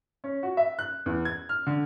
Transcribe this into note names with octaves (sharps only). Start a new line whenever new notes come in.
C#4
F#4
E5
F#6
E2
G#6
F6
D3